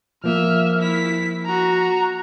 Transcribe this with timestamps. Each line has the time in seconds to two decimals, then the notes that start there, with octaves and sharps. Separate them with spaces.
0.24 F3 A#3 E5 F6
0.78 E4 B6
1.46 F#4 A#5